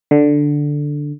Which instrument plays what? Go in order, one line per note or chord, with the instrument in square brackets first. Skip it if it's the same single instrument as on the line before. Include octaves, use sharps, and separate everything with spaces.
[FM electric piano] D3